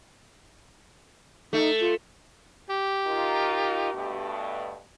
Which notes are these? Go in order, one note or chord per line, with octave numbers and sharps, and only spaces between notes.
A3 D#4
F4
G4
D#4 F4 A#4
G2 B2 A3